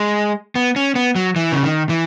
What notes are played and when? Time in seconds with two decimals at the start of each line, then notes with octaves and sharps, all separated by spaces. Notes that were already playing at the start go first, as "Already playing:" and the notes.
Already playing: G#3
0.55 B3
0.76 C#4
0.95 B3
1.16 F#3
1.36 E3
1.52 C#3
1.63 D#3
1.89 E3